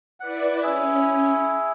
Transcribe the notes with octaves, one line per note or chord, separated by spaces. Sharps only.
E4 B4 D5 F#5
C#4 E4 G#4